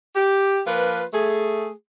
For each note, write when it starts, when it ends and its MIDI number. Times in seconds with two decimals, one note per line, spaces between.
0.15 0.61 67
0.67 1.04 53
0.67 1.04 58
0.67 1.04 65
0.67 1.04 71
1.13 1.71 57
1.13 1.71 68